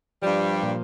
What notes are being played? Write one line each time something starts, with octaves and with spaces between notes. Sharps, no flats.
G2 F3 G3
A#2